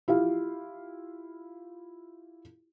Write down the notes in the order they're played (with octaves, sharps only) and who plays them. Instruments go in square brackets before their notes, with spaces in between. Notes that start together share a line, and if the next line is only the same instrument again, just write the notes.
[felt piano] E4 F4 G4 F5